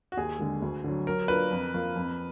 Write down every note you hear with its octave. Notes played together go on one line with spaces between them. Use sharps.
F#4
D#2 G#4
D3 G#3
D2
D3 F#3
F#3 A#4
A#3 D4 F4 B4
F2
F3 A#3 F4
F2